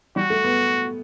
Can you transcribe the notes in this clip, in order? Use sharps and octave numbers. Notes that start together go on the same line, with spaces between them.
G3 F#4
A3
B3